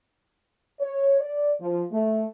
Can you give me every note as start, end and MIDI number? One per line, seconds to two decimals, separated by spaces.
0.81 1.18 73
1.21 1.52 74
1.61 1.82 53
1.92 2.25 57